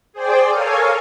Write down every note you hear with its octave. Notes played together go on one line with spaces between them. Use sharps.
G#4 C5 D5 G5
A4 A#4 C#5 F5 G#5